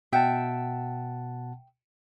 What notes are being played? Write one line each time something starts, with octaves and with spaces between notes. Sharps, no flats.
B2 E5 F#5 G5 A5